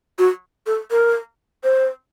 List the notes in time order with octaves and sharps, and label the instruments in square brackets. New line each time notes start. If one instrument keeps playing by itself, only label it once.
[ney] F#4
A4
A#4
C5